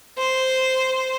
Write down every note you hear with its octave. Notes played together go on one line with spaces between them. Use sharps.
C5